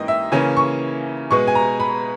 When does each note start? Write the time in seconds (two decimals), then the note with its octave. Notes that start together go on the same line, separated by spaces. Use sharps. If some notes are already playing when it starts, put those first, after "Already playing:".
Already playing: G#2 E3 A#3 C#4 D#5 G5
0.08 E5
0.32 C#3 E3 A#3 C#4 G#5
0.57 C#6
1.31 B2 G#3 B3 C#6
1.47 G#5
1.55 A#5
1.80 B5